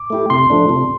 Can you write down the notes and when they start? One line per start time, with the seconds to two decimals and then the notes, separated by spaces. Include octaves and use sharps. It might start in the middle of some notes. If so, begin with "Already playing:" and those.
Already playing: D6
0.10 A3 E4 G4
0.30 C3 C6
0.50 F3 A3 D4
0.69 C3